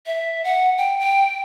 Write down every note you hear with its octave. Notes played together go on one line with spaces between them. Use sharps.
E5
F#5
G5
G5